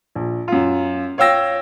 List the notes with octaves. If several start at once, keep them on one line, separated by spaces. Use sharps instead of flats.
A#1
F#2 F4
C#5 F5 G5 E6 A#6